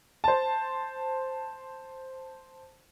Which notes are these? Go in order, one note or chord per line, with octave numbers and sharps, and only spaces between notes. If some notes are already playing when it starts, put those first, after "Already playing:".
C5 A5